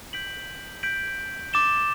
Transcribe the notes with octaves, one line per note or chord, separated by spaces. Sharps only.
G6 B6 D7 F#7
G6 B6 D7 F#7
D6 A6 E7 G7